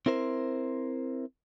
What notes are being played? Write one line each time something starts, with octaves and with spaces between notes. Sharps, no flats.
C4 E4 A#4 C5